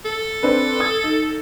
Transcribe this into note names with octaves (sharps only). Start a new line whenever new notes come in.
A4
C4 D4 B4
D#6 G#6
D#4